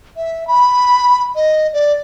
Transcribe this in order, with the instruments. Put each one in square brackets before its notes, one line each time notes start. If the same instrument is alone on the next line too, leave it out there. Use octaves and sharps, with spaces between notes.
[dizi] E5
B5
D#5
D5